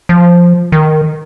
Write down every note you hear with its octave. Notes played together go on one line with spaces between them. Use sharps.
F3
D#3